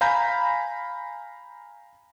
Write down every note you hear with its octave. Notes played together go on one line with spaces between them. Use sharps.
F5 G#5 A#5 B5 G6